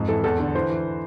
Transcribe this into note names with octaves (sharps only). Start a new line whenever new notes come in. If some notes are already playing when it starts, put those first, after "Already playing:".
Already playing: F2 G#2
E3 A4
E2 A4
D3
E3 C5
E3